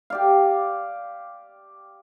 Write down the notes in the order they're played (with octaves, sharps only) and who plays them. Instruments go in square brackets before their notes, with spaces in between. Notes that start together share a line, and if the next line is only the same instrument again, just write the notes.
[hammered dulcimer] G4 D5 F5